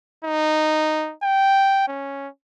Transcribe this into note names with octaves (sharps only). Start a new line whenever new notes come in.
D#4
G5
C#4